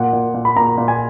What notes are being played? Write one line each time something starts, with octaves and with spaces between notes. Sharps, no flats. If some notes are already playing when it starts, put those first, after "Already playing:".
Already playing: A#2 F#5
A#2
A#2
B5
A#2 A#5
A#2
G#5